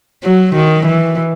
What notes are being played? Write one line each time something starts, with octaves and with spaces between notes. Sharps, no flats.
F#3
D#3
E3